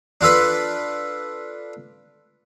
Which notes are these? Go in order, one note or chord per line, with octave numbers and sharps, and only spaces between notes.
D4 F4 A4 B4